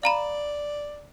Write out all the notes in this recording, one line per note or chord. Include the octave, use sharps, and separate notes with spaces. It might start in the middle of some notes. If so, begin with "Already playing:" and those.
D5 F5 A#5 B5